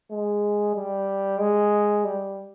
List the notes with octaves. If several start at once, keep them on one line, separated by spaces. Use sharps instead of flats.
G#3
G3
G#3
G3